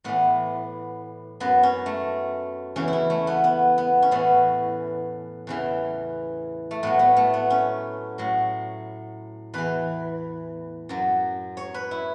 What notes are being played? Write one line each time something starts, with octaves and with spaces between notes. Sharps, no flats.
A2 E3 B3
F#2 F#3 B3
C#4
A3
E2 C#3 E3 C#4
E4
C#4
A3
B3
B3
B3
C#4
A2 E3 B3
E2 C#3 E3
A3
A2 F#3 B3
B3
A3
B3
C#4
A2 F#3
E2 E3 B4
F#2 F#3
C#5
B4
E4